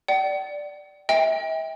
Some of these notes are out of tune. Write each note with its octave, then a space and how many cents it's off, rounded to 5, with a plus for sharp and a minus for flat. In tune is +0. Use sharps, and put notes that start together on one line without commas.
D5 +0 G5 -45
E5 -40 G5 +25